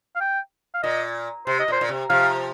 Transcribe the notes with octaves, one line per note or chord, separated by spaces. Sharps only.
F5
G5
F5
A#2 D#5
C3 C5
D#5
A#2
C5
A#2
C3
C3 F3 F5